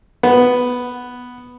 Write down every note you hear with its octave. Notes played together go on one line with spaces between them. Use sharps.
B3